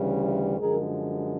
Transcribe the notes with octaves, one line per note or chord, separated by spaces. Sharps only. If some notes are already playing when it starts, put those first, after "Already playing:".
Already playing: D2 C#3 E3 G3
F#2 D3 F3 G#3 G#4 A#4